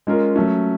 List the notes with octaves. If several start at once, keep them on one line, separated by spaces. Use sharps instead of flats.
G#3 C#4 F4 A#4
F#3 A3 C#4